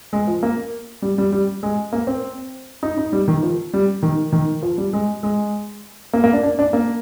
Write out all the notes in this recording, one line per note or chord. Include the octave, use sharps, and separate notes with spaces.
G#3
F3
A#3
G3
G3
G3
G#3
A#3
C4
D#4
D#4
G3
D#3
F3
G3
D#3
D#3
F3
G3
G#3
G#3
A#3
A#3
D4
D4
D4
A#3